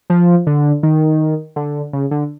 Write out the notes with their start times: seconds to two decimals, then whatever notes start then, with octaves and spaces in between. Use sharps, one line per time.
0.10 F3
0.47 D3
0.83 D#3
1.56 D3
1.93 C#3
2.11 D3